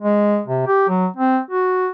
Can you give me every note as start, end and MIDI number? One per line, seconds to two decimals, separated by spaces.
0.02 0.41 56
0.47 0.64 48
0.67 0.87 67
0.89 1.07 54
1.16 1.39 60
1.51 1.89 66